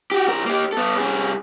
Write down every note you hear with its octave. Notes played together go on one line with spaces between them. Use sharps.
F#4 G4
B1 A#4
A#3 G4
B3 A4
C2 G#4